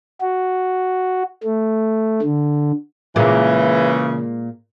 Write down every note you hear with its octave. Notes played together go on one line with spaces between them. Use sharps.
F#4
A3
D3
A#2 C#3 E3 G#3